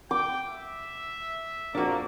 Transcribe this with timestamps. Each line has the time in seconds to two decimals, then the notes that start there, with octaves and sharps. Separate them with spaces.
0.11 G5 D6
0.48 E5
1.75 A#1 F2 A#3 D4 F#4